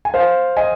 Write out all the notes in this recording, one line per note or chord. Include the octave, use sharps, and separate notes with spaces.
G#5
C5 F5
D#5 G#5